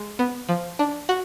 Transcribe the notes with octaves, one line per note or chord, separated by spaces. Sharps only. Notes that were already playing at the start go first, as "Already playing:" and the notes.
Already playing: G#3
B3
F3
D4
F#4